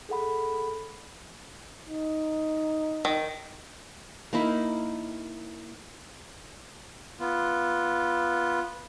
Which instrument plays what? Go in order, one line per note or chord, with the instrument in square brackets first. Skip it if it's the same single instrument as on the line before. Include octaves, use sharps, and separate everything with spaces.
[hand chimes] G#4 A4 F#5 B5
[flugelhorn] D#4
[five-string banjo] D#3
[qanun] A#3 D#4 E4
[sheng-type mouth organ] B3 F4